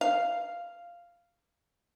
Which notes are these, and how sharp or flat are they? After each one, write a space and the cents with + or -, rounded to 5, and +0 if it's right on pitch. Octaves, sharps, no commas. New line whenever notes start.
F5 -5